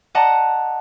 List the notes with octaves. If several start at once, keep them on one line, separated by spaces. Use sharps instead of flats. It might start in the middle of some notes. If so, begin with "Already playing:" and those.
D5 D#5 F#5 A5 A#5